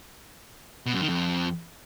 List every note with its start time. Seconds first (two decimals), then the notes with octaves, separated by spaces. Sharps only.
0.86 B2
0.94 F#2
1.01 D#3
1.09 F2